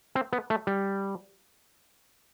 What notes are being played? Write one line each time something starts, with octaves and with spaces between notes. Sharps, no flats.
C4
B3
A3
G3